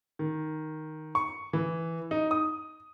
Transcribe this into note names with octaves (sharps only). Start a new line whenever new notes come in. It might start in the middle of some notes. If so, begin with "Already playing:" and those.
D#3
C#6
E3
D#4
D#6